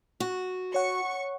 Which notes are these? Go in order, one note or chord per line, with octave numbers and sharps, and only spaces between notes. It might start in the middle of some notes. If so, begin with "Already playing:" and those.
F#4
C#5 F#5 C#6